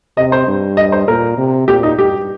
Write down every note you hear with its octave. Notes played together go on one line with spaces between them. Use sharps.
C3 D#5
C5
G2
D#5
C5
A#2 A#4
C3
A#2 G4
D#4
G2 G4